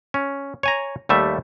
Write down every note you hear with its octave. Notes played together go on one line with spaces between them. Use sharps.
C#4
C#5 G#5 A#5
D#2 G3 A3 E5